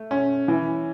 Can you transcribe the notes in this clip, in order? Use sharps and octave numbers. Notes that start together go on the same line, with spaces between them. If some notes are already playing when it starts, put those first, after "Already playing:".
Already playing: A3
C#4
E3